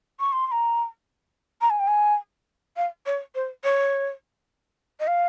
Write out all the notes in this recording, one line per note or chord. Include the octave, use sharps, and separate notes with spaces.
C#6
C6
C6
A#5
A#5
G#5
G5
G#5
F5
C#5
C5
C#5
D#5
F5